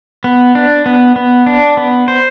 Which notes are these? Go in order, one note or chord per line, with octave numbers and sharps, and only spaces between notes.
B3
D4
B3
B3
D4
B3
C5